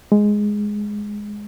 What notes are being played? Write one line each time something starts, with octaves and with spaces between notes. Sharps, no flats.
G#3